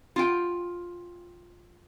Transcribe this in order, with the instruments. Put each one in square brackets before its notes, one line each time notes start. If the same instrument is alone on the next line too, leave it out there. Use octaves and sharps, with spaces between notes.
[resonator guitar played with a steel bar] F4 G5